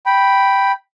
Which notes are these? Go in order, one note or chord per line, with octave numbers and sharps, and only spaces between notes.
G5 B5